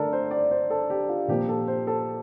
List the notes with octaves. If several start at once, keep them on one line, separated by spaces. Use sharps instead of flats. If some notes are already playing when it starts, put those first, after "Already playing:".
Already playing: D3 A3 A4 A#4 D5
C5
D5
C5
A4
G4
F4
A#2 F3 A#3 G4
A4
C5
A4